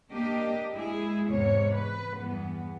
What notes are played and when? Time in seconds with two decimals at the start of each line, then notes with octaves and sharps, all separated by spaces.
0.12 A#3 D4 G4 D#5
0.73 G#3 E4 G#4
1.28 E2 G#2 C3 C#5
1.73 B4
2.20 E2 G2 B3